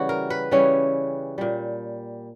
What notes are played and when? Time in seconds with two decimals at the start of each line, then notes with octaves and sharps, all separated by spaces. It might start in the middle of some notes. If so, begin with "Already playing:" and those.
Already playing: C#3 E3 G3 F#4
0.09 A#4
0.30 B4
0.51 C#3 E3 G3 C#4
1.38 A#2 G3